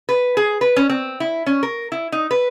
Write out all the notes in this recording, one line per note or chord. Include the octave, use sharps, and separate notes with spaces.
B4
G#4
B4
C#4
C4
E4
C#4
A#4
E4
D#4
B4